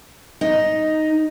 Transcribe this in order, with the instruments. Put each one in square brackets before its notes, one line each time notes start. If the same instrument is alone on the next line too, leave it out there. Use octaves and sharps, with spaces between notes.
[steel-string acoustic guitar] D#4